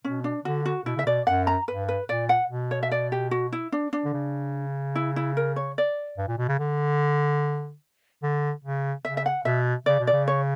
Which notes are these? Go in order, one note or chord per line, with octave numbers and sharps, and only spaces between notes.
B2 C#4
D4
D3 F#4
F#4
B2 E4
C#3 E5
B2 D5
F#2 F#5
A#5
G2 B4
B4
A#2 D5
F#5
B2
C#5
E5
D5
G4
F#4
E4
D4
D4
D3
C#3
E4
E4
A#4
C#5
D5
G2
A#2
B2
C#3
D3
D3
C#3
C#3 E5
E5
F#5
B2 E5
C#3 D5
B2
D5
C#3
C#5